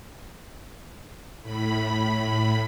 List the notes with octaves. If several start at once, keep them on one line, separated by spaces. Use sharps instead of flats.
A2 B5